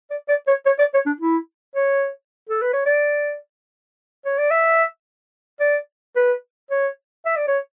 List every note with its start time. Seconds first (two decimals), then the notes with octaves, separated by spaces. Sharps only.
0.11 D5
0.29 D5
0.48 C#5
0.66 C#5
0.79 D5
0.94 C#5
1.07 D4
1.20 E4
1.75 C#5
2.49 A4
2.62 B4
2.73 C#5
2.86 D5
4.25 C#5
4.38 D5
4.51 E5
5.60 D5
6.16 B4
6.71 C#5
7.26 E5
7.37 D5
7.48 C#5